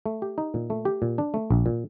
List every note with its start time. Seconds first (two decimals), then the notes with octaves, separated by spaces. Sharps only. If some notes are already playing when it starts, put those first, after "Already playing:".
0.06 A3
0.22 G4
0.38 D#4
0.54 A#2
0.70 A3
0.85 G4
1.02 A#2
1.18 D4
1.34 A3
1.50 A#1
1.66 A#2